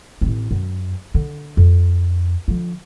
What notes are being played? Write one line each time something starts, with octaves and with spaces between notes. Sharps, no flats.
A1 C4
F#2
D3
F2
D3 F3